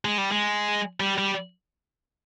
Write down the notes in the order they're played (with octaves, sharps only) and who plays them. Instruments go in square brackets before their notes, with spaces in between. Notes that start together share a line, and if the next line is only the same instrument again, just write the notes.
[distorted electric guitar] G#3
G3
G#3
G3
G3